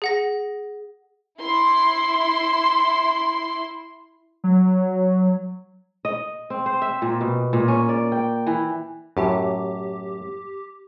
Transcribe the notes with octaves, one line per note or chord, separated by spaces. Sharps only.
G#4 F#5 A#6
E4 C6
F#3
D#5
C4
C5
E5
A#2
B2
A#2
C#4
D5
G5
E3
F#2 A2 G4